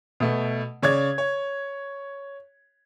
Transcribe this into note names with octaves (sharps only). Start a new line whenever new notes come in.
B2 A3
C#3 C#5 D5 G#6
C#5